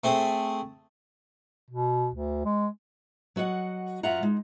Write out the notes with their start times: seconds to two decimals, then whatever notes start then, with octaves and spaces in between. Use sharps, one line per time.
0.04 A3 C4 G#4
1.70 B2
2.15 D2
2.45 G#3
3.36 F#3 F#4 D#5 F#5
4.03 F#2 F#3 F4 E5 F#5 A#5
4.23 G#3 D#4